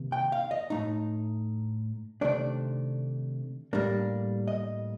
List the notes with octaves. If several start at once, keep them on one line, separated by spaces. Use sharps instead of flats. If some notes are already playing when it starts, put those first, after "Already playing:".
Already playing: C3 D#3 A#3
G5
F5
D#5
A2 A3 D#4
C3 D#3 A3 D4 D5
A2 G3 A#3 D4
D#5